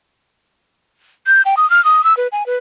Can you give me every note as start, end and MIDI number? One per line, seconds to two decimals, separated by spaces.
1.27 1.42 91
1.45 1.55 79
1.57 1.68 87
1.70 1.83 89
1.85 2.04 87
2.04 2.16 88
2.17 2.27 71
2.32 2.46 80
2.46 2.56 71